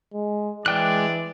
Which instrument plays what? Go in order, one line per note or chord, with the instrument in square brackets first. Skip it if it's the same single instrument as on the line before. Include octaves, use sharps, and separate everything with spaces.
[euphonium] G#3
[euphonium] E3 [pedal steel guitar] G#3 G5 F#6 [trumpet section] C4 D4 D5